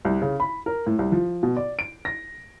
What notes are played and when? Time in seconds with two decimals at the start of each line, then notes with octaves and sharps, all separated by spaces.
0.05 C2
0.22 C#3
0.40 B5
0.66 A#4
0.86 A2
0.99 C2
1.12 F3
1.43 B2
1.57 D5
1.79 D7
2.05 A#6